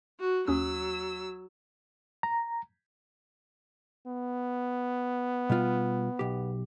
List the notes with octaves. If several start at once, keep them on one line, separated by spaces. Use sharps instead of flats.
F#4
D#2 F#3 C#4 D#6 E6
A#5
B3
B2 G3 F4
B1 G4